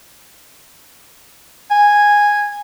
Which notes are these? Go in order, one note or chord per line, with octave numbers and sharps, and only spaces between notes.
G#5